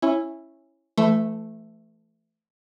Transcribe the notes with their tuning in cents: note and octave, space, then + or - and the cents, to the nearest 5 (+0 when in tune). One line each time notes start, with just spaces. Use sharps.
C#4 -15 E4 +0
E3 +40 A3 +0